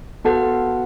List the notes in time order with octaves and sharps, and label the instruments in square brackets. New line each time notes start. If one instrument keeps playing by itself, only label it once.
[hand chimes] B3 F#4 B4 F#5 [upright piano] A4